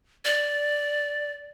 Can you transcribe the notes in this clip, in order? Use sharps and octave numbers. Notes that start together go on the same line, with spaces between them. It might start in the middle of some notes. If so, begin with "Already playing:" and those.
D5